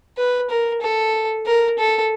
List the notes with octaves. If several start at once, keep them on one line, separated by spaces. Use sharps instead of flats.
B4
A#4
A4
A#4
A4